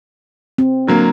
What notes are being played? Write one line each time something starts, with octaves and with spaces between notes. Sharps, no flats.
C4
D3 F#3 A#3